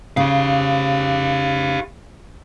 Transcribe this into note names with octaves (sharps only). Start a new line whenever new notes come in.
C#3 G4 F5